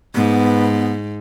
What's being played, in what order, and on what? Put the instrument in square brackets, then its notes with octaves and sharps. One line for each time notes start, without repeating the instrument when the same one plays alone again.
[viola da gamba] G#2 [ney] B3